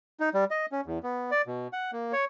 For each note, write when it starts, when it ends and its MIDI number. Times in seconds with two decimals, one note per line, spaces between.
0.20 0.29 63
0.34 0.44 55
0.51 0.66 75
0.72 0.81 61
0.86 0.99 40
1.03 1.31 59
1.31 1.42 74
1.47 1.68 47
1.73 1.91 78
1.93 2.13 58
2.13 2.25 73